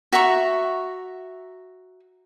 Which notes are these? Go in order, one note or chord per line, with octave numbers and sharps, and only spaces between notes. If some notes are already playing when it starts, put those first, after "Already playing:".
F#4 E5 A#5 C#6